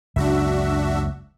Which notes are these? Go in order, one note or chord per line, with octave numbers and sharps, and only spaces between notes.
F#1 C#2 F#2 D4 F#4 E5